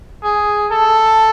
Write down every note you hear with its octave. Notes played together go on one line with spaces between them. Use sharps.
G#4
A4